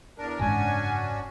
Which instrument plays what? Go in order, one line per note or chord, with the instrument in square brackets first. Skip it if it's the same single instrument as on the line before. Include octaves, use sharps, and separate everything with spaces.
[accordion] E2 D4 A#4
[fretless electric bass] F#1 G#2 G#3 [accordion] C#4 D4 F#4 [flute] G#5